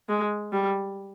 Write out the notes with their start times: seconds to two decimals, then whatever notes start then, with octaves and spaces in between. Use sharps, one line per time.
0.09 G#3
0.53 G3